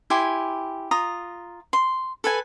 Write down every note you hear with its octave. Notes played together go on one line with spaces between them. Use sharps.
E4 G4 G#5 C6
F4 A#5 D#6
C6
A4 B4 G#5